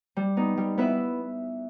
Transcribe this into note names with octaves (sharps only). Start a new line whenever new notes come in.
G3
B3 D#4
G3
B3 E4 B4 E5